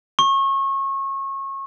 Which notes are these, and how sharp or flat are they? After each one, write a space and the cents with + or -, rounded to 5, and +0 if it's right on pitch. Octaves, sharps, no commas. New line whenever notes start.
C#6 -30